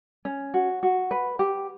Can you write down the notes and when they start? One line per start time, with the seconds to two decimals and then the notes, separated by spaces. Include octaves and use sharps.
0.25 C#4
0.54 F#4
0.83 F#4
1.11 B4
1.39 G4